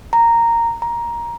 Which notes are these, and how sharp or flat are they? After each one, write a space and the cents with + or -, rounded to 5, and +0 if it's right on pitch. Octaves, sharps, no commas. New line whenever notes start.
A#5 -10
A#5 +10